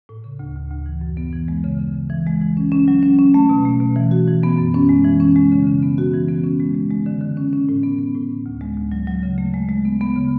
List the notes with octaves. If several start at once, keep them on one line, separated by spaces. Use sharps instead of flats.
A2
C#3
D2
D2
D2
E3
F#2
B3
E3
G#3
C#3
C#3
C#3
E3
G#3
E3
C#4
C#4
F#3
C#4
C#4
A3
B2
A3
B2
E3
F#4
E3
B3
F#2
C#4
G#3
E3
C#4
G#3
C#3
C#3
B3
F#4
E3
B3
C#4
G#3
G#3
G#3
D3
D3
C#4
C#4
A2
B3
B3
A2
C#4
D2
G#3
D2
F#3
F#3
C#3
A3
G#3
G#3
B3
B3
C#3